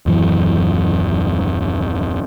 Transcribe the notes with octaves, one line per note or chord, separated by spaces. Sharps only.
D#1 F#2 E3